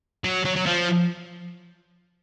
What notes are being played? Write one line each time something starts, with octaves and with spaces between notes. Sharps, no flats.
F#3
F#3
F#3
F3